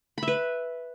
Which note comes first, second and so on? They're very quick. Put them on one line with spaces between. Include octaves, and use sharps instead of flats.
B5 E5 B4